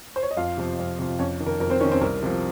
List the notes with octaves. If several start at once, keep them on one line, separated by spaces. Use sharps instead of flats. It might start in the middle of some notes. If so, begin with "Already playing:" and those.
C5
C#5
D#5
F2 F4 F5
C3 F3
F2
C3 F3
F2 C#4 C#5
D#3
A#4
F2 A#4
C4 C5
D#3 C#4 C#5
C4 C5
C2 A#4
C3 F3